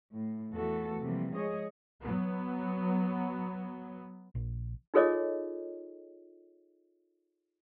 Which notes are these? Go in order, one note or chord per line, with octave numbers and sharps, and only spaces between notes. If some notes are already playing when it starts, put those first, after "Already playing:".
A2
E2 E3 A3 F#4 A4
C3 E3 F3 G3 A#3
F3 G#3 G#4 C#5 D#5
F#3 B3
A#1
D#4 F4 G#4 A4 C#5 D#5